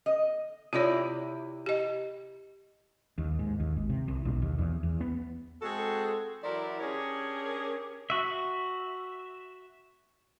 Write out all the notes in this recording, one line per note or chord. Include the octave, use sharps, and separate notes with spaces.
D#5
C3 E4 F4 C#5 D5
G4 D#5
D#2
G#2
D#2
G#1
C3
C2
B1
D#2
E2
E2
B3
G#3 C4 F#4 G#4 A4
E3 F#3 E4 A#4 C5 D5
C#4 D4 G4 G#4 A#4 C#5
F#4 E5